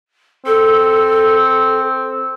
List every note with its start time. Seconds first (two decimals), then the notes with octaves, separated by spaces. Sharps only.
0.46 C4 A4